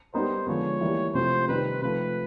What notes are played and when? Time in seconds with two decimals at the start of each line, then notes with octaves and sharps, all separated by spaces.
0.14 G3 B3 D#4 G4 A#4 C5
0.47 D3 F3 G#3 B3 C#5
0.81 E3 G3 A#3
1.14 C3 F3 A3 C4 F4 C5
1.48 C3 D#3 G3 C4 D#4 B4
1.82 C3 F3 A3 C4 B4